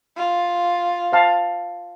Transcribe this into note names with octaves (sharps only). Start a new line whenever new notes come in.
F4
C5 F5 A5